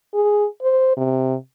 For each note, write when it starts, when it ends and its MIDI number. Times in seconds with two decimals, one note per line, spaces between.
0.14 0.46 68
0.62 0.96 72
0.97 1.35 48